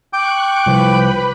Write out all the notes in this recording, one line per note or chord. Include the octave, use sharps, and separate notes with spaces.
G5 C#6 D6 F#6
C2 F3 B4 B5